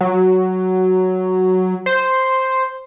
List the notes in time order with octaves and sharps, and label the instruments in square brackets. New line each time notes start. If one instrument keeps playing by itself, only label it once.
[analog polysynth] F#3
C5